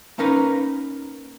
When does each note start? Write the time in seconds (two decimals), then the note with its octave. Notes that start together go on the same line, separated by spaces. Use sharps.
0.18 A#3 C#4 D#4 A#4 B4